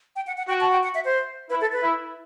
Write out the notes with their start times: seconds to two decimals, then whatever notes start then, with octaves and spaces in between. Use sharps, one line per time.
0.16 G5
0.27 F#5
0.38 F#5
0.49 F#4 G5
0.61 A5
0.71 G5
0.83 F#5
0.95 E5
1.05 C5
1.50 E4 B4
1.61 A4
1.72 B4
1.84 E4